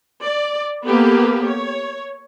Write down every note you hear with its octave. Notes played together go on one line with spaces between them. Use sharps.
D5
A#3 B3 G4 A4 B4
C#5